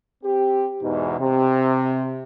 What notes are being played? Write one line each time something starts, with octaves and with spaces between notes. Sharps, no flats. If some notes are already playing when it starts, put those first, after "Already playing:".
C4 G4
E2 G#2 B2 D#4
C3